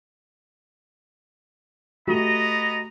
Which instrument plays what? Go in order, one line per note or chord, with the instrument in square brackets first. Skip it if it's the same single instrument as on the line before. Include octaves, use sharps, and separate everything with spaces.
[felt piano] A3 F#4 G4 [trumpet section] B3 D#5 A#5